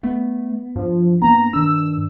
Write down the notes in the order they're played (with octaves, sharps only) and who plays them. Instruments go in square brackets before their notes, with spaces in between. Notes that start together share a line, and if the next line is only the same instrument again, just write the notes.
[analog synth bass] A3 [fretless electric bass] B3
[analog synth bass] G2 [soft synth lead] F3
[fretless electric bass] A#3 B3 [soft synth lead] A#5
[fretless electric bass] D#3 D4 [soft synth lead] E6